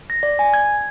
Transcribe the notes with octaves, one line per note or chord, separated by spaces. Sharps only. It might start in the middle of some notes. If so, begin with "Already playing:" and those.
A#6
D5
G#5
G#6